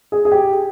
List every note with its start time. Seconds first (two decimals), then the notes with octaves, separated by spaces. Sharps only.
0.12 G#4
0.25 G#4
0.32 G4